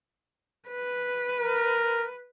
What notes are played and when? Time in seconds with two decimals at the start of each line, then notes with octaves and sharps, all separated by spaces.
0.69 B4
1.41 A#4